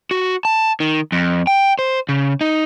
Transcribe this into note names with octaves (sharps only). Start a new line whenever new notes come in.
F#4
A5
D#3
F2
G5
C5
C#3
D#4